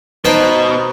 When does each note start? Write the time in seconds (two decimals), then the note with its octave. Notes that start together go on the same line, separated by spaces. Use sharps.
0.25 B2 D#4 B4 C5 G5 A5